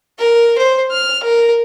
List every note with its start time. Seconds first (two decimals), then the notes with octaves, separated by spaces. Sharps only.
0.18 A#4
0.58 C5
0.92 F6
1.23 A#4